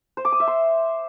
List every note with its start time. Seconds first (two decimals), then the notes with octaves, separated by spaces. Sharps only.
0.17 C5
0.25 D6
0.32 D#6
0.40 E5
0.47 C6